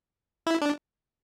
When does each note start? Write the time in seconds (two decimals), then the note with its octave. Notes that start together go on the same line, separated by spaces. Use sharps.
0.47 E4
0.62 D4